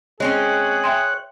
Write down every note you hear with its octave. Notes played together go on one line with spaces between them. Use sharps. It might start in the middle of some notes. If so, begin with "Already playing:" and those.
G#3 C4 C#4 G#4 C#5 F#6
E5 G5 C6